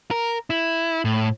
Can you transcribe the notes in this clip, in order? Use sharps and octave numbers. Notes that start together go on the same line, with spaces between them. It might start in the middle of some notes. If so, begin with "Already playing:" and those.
A#4
E4
A2